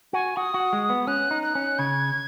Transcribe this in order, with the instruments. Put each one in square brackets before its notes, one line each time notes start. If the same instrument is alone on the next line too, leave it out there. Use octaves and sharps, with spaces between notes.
[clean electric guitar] F#4 [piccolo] G#5
[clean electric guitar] F#4 [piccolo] D#6
[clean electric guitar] F#4
G#3
B3
[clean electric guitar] C#4 [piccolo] F#6
[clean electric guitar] D#4
[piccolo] F#6
[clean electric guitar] C#4
[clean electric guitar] C#3 [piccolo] G#6